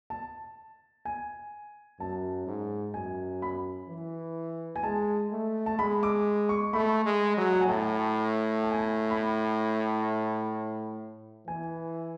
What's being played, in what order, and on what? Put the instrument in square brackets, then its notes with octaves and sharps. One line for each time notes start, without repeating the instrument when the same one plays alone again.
[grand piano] A5
G#5
[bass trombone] F#2 [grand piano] A5
[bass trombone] G#2
[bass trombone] F#2 [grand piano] G#5
[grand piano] B5
[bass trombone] E3
[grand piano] G#5
[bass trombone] G#3 [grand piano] A5
[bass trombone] A3
[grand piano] A5
[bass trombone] G#3 [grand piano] B5
[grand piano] D6
C#6
[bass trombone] A3 [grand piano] B5
[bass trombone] G#3
F#3
[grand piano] F#5
G#5
[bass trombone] A2 [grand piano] A5
[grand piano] A5
G#5
A5
B5
[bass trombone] E3 [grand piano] G#5